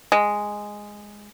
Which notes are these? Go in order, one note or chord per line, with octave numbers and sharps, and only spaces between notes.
G#3